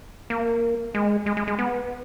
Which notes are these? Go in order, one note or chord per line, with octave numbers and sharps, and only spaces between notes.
A#3
G#3
G#3
G#3
G#3
B3